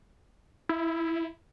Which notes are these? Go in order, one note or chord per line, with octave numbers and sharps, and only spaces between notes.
E4